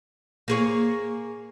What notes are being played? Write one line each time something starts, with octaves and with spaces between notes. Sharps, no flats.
A#3 G#4 C#5